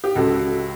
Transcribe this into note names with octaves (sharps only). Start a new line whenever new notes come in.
G4
C#2 F#4 A4